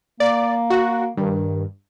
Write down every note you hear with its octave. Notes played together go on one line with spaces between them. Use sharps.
A#3 D5
F#4
G2 D#3